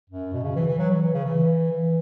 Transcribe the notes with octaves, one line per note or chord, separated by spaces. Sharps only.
F#2
B2
C#3
E3
E3
F#3
E3
E3
C#3
E3
E3